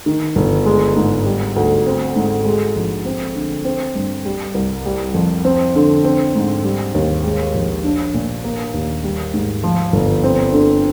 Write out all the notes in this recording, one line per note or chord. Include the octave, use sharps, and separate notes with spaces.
D#3
G1
G#3
G#2
G3
D2
C4
G#2
G#3
A#1
C4
D3
C4
G2
G3
C2
G3
F2
C4
D3
C4
G#2
G3
D#2
G#3
A#1
D4
A#2
A#3
D#2
G3
G#2
F3
G1
C4
D3